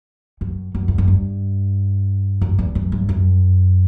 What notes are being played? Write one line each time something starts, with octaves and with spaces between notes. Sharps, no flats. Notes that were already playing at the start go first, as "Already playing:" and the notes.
F#2
F#2
E2
F#2
G2
F#2
E2
F#2
G2
F#2